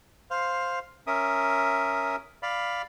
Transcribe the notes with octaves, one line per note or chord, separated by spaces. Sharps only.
C5 F5
C#4 A#4 E5 D#6
D5 F5 B5